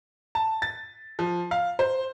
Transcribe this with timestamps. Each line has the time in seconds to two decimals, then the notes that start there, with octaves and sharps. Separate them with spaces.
0.35 A5
0.62 A6
1.19 F3
1.51 F5
1.79 C5